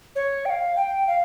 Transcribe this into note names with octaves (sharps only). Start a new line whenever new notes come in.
C#5
G5
F5
G5
F5